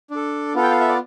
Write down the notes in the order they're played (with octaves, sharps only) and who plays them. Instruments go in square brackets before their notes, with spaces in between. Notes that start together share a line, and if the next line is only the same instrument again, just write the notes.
[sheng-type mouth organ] D4
A4
B3 F4 A4
G5
F5
E5
D5